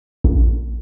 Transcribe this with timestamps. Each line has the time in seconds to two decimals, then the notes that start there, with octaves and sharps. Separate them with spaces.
0.24 A#1